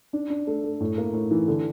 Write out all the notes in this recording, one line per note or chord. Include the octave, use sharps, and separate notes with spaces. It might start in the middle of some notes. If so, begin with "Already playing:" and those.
D4
D4
A3
A3
A2
A#3
A2
E3
D3